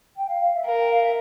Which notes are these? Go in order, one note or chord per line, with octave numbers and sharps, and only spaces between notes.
G5
F5
F5
E5
A#4 F5
G5
F5
E5